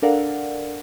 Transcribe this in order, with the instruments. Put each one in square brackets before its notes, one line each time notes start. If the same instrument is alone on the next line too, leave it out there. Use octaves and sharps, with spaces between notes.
[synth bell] D4 A4 A#4 D5 F5 F#5